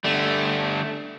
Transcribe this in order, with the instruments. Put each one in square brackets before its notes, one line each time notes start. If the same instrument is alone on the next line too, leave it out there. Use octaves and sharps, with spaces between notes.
[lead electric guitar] D3 G3 [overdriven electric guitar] A3